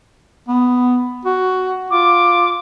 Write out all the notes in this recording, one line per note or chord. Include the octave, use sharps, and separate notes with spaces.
B3
F#4
F4 D6